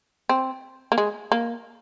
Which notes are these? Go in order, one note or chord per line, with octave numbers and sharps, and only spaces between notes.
C4
A#3
G#3
A#3